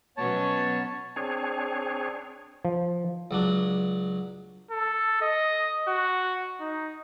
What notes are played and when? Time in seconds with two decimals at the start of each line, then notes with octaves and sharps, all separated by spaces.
0.17 B2 F#3 B3 C#4 C#5 A5
1.16 C4 D4 G#4 C#5
2.65 F3
3.31 C#2 F#3 D4
4.71 A4
5.22 D#5
5.88 F#4
6.60 D#4